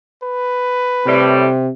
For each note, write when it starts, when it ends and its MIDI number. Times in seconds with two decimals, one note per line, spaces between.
0.23 1.39 71
1.06 1.48 45
1.06 1.69 48
1.06 1.48 55